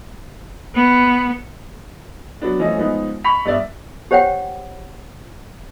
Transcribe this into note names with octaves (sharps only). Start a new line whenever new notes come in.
B3
F#3 B3 D4
E3 F3 A3 C#4 D#5
F3 G#3 B3 D#4
B5 C#6 B6 F7
G2 B3 D5 E5
G4 C5 C#5 F#5 G5